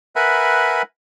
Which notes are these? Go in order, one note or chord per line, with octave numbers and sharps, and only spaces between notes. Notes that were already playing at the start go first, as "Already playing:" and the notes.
A#4 B4 E5 F#5 G#5 B5